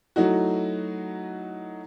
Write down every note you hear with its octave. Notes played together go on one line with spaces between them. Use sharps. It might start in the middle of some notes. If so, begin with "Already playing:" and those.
F#3 A3 D#4 E4 F#4